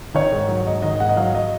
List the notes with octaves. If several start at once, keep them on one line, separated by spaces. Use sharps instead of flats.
D#3 C#5
G#2
F#3
G#2 D#5
D#3 D#5
G#2 F#5
D#5
F#3 F5
F#3 D#5